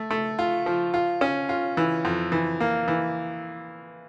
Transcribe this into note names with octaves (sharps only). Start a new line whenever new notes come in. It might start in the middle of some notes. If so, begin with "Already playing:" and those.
Already playing: A3
A3
F4
F3
F4
C#4
F4
E3
F2
E3
A#3
E3